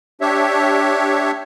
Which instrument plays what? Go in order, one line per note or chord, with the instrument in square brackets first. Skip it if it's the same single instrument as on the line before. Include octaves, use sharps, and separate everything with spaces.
[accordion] D4 G4 C#5 E5